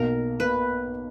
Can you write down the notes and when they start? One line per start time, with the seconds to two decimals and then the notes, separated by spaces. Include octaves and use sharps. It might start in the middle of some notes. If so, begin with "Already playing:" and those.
Already playing: B1 B2 A#3 A#4
0.40 B2 A#3 B4